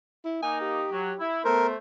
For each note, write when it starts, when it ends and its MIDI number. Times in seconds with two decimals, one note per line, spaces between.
0.25 0.40 64
0.43 0.87 58
0.43 0.87 63
0.43 0.58 80
0.61 1.27 67
0.93 1.13 54
1.20 1.44 64
1.45 1.76 57
1.45 1.73 59
1.45 1.67 70
1.45 1.76 72